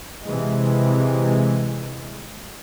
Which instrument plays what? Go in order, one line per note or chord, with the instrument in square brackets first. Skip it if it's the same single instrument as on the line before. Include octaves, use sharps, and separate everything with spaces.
[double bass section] C3 E3 G#3